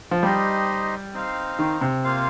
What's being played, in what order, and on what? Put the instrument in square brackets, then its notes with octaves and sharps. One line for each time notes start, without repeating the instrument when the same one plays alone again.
[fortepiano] F3
[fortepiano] G3 [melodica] D#4 G4 C5 D#5
[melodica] C4 D#4 C5 F5
[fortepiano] D#3
C3
[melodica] A#3 F4 C5 F5